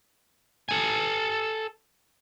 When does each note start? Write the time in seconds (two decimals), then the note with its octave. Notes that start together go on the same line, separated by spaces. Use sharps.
0.69 A4 G#5